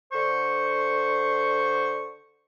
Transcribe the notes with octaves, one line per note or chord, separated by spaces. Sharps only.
D3 C5 C#6